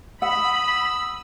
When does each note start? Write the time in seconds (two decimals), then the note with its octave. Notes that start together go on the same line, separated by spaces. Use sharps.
0.22 F#5 B5 D#6 E6